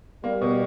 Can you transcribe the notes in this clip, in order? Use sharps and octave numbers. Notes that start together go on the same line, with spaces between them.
G3 A#3
B2